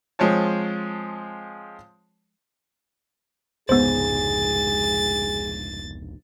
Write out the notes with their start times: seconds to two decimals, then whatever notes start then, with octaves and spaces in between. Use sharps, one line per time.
0.19 F3 G#3 C4 C#5 A5
3.69 F1 C#2 G#2 B3 G#4 C5 A6